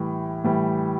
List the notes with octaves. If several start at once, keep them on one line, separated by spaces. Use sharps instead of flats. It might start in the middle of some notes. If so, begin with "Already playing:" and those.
Already playing: A2 E3 G3
A2 E3 G3